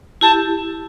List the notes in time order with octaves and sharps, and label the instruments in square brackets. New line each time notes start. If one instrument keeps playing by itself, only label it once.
[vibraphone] E4 G4 [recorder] A5